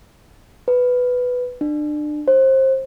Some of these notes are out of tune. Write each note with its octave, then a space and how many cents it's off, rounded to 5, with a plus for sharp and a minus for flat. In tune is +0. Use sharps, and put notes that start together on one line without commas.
B4 +5
D4 +30
C5 +25